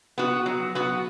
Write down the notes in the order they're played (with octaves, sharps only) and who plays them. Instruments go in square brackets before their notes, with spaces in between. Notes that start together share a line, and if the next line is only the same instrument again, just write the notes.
[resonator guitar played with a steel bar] B3 F#4
F#3
B3 F#4